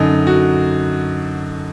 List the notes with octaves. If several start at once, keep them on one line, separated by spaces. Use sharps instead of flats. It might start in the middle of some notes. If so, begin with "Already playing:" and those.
Already playing: F#2 D3 D#4
F#4